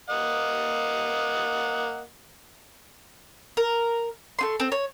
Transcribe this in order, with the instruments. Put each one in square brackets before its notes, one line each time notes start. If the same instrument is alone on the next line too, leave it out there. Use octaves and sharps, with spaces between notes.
[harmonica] A#3 D#5 F#5
[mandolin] A#4
A3 D#4 C6
C4
C#5